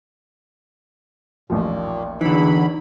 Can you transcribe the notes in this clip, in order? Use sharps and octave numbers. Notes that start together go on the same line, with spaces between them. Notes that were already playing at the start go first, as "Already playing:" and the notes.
A1 D#2 A#2 F3
E2 D3 E3 F#3 D#4 B5